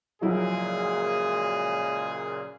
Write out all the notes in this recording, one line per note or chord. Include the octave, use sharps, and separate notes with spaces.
F#2 A#2 C#3 F3 F#3 G#3 E4 G#4